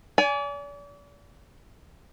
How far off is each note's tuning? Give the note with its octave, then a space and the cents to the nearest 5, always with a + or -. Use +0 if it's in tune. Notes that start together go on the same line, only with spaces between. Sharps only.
D5 -40 G#5 +5